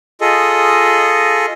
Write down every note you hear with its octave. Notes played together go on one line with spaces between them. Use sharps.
F4 G#4 A4 D#5